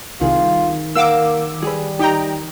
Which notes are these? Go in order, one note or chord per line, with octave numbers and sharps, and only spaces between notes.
C2 D#3 F4 G#4
A#3 A#4 F5 F#5 D6 E6
G3 G#4 B4
D#4 G4 G5 A#5